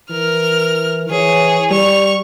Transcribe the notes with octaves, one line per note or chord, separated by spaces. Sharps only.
E3 A#4 F6
E3 G#4 C#5
G3 C#6 F7